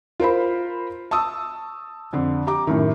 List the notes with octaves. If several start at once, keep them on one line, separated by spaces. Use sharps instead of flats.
F4 A#4 C5 B5
A5 C#6 D#6 E6
F2 D3
G4 A#5 D6
F#2 A2 D#3